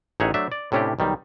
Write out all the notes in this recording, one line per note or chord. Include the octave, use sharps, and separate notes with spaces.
A1 D#4 G#4 C#5 E5 F#5
F#3 A3 D4 C5 E5
D5
A2 C3 C#4 D4 E4 G4
B1 D#3 G3